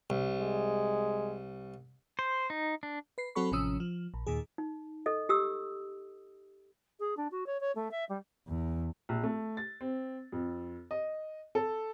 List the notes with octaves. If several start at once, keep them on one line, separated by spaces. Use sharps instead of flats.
C2
G#3
C5
D#4
D4
B4 C7
F#3 C4 F#4 A4 B5 C#6
A1 C3 F3 C#4 D#6 E6
F3
A#1
D#2 A#2 D#3 G#4
D#4
A4 D#5
G4 D#6 E6
G#4
D4
F#4
C#5
C#5
A3
E5
G3
E2
A#1
A3
A6
C4
F2
D#5
A4